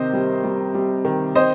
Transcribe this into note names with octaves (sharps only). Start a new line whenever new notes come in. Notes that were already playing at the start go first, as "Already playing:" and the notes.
Already playing: C3 D#3 C5 D#5
G3
G3
G3
D#3
C4 C5 D#5